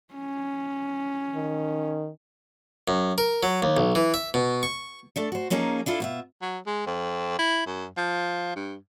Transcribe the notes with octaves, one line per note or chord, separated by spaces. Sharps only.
C#4
D#3
F#2
A#4
F#3
D#2
B1
E3
E5
B2
C#6
A3 D4 A4
F#4 C5
F3 A#3 C#4 D#4 G#4 A#4
D4 E4 F4 A4
B2 F4 E5
F#3
G#3
F2
E4
F#2
F3
G2